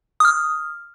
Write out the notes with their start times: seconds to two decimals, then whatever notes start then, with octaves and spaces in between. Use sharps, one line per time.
0.20 D#6 F6